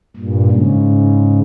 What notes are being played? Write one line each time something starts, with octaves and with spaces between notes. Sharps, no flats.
G2 A#2
G#2 C#3